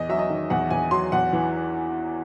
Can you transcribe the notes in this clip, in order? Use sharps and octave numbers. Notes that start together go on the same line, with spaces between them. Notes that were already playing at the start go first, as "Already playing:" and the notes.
Already playing: E2 D#5
F#3 E5
D#5
D#3
E2 F#5
E2 G#5
F#3 C6
E2 F#5
E3